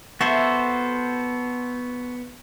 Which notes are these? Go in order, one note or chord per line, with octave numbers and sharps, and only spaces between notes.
B3 F#4 A4 C5 E5